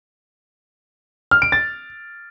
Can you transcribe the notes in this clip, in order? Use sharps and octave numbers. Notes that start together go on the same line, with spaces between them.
F6
D7
A6